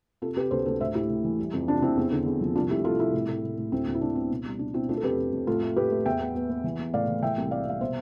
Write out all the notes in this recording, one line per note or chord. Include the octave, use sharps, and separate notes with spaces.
C3 F4 A4
C3 G4 B4
D2 A4 C5
D2 A4 C5
A2 C5 E5
A2 E4 G4
A2
E3
G3
F2
C3 D4 F4
F2 C4 E4
E2
D3
E2
F3
C2 D4 F4
A3 E4 G4
C2 F4 A4
C2 E4 G4
A2
A2
A2
A2
D2 C4 E4
D2
E4
D2 D4
B3 C4
B2
G3
B2 D4
B2 C4 E4
A3 D4 F4
A4
F2 G4 B4
F2
F2
A2 F4 A4
A3
A2 G4 B4
A3
E2 E5 G5
B3
B3
B3
E3
B3
A2 D5 F5
E3
E3 E5 G5
C2
A3 D5 F5
C2 F5
B2 C5 E5